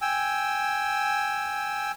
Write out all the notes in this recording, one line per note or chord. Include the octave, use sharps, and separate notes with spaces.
G5 G#5 E6